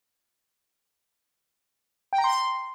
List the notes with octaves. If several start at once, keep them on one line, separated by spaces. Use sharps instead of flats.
G5
A#5
C6